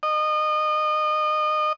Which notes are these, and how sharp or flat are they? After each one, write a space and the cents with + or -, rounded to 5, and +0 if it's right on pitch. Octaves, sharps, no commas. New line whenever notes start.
D#5 -30